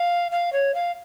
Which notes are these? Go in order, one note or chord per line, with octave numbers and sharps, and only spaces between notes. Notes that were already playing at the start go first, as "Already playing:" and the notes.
Already playing: F5
F5
C#5
F5